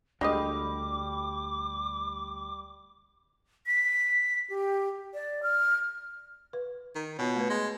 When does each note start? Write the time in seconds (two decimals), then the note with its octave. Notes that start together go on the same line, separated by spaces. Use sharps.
0.21 D2 D3 G3 G#3 G4 D#5 D6
3.66 B6
4.50 G4
5.14 D5
5.43 F6
6.53 B4
6.95 D#3
7.19 B2 B3 F4 C#5
7.36 A3 B4
7.50 G#3